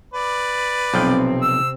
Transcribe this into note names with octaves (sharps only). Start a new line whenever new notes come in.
B4 D5
B1 C3 F3 C4 G5
E6